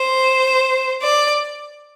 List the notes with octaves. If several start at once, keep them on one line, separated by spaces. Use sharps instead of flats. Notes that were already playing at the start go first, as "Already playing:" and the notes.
Already playing: C5
D5